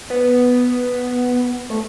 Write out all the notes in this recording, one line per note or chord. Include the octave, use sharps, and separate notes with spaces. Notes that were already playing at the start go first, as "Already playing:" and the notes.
B3
A3